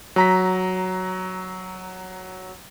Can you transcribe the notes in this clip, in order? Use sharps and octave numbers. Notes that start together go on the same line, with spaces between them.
F#3 A#5 B6